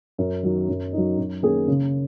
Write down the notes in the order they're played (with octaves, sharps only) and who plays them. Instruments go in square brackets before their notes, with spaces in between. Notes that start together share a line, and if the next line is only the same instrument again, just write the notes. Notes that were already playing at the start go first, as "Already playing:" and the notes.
[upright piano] F#2
D#3 F#3
F#2
F#3 D#4
F#2
D#3 A#3 C#4 G#4
C#3